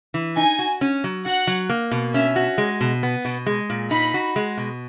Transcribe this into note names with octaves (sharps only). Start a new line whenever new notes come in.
E3
D#4 G#5
F#4
C#4
F#3
F#4 F#5
F#3
A#3
B2
C#4 E5
F#4
G#3
B2
B3
B2
G#3
A#2
D#4 B5
F#4
G#3
B2